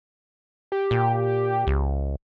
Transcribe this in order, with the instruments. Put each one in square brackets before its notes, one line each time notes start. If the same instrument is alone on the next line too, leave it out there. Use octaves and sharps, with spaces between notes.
[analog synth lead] G4
[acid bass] A#2
C#2